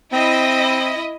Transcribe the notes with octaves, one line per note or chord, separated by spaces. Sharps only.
C4 E4 D#5